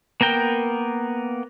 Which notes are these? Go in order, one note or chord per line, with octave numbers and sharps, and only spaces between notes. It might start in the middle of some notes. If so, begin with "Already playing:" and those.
A#3 B3 A#4 G5